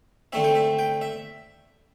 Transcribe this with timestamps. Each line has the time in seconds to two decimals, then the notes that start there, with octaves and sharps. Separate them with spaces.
0.32 D3 A3 C4 E5
0.44 G5
0.55 E5
0.79 G5
1.01 E5